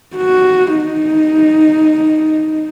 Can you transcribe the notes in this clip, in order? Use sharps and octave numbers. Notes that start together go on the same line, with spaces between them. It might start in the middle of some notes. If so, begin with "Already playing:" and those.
F#4
D#4